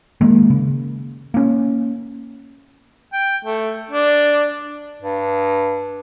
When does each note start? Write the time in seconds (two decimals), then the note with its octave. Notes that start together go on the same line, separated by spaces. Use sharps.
0.21 D#3 G#3 A#3
0.50 C#3
1.34 A#3 C#4
3.13 G5
3.45 A3
3.90 D4
5.02 G2